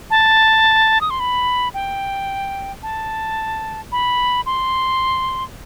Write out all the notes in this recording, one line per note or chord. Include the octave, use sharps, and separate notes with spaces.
A5
D#6
C6
B5
G5
A5
B5
C6